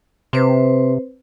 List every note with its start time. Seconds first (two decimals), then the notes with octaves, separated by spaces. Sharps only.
0.33 C3 C4 B4 C5